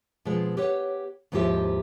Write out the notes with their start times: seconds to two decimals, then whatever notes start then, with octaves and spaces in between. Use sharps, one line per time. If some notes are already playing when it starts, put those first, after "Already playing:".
0.25 B2 F3 G#3 C4
0.57 G4 B4 C#5 F#5
1.32 D#2 G#2 F3 E4 G4 E5